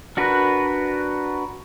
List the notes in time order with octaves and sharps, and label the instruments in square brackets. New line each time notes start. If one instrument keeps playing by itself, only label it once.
[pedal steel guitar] D4 F#4 A#4 B4